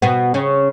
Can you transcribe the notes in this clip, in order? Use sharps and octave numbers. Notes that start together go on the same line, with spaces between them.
B2 B3
C#3 C#4